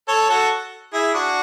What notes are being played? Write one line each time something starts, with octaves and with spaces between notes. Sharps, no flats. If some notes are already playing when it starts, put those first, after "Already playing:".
A4 C#5
F#4 A4
E4 G#4
D4 F#4